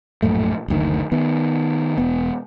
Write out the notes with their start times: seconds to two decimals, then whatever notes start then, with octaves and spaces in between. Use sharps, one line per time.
0.23 A#1 F#2 A2 A3
0.68 F#1 D2 D#3
1.12 D#3 B3
1.98 E1 B3